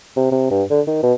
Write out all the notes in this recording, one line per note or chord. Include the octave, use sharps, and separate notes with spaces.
C3
C3
G2
D3
D#3
B2